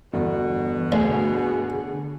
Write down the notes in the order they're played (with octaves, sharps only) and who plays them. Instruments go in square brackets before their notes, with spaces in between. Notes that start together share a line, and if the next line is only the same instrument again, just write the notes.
[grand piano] G1 [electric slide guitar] E2 [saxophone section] B2 F#4
[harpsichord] D2 [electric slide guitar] D3 G#4